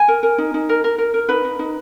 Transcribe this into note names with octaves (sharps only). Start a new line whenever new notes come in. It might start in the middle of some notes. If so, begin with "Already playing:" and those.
Already playing: G#5
A#4
A#4
D#4
D#4
A#4
A#4
A#4
A#4
D#4 B4
D#4
D#4